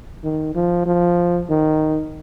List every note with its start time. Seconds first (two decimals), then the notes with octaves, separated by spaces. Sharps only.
0.24 D#3
0.55 F3
0.86 F3
1.49 D#3